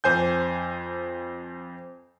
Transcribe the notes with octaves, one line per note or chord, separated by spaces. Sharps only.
F2 C5 G#5 G6